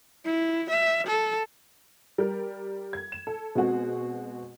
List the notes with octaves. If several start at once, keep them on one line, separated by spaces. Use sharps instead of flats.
E4
E5
A4
G3 A#4
G#6
E7
A4
B2 G#3 C4 F#4 G#4